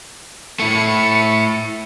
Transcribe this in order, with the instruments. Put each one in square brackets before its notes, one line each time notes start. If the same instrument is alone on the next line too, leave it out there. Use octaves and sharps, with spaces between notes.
[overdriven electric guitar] A3 E4 [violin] C#7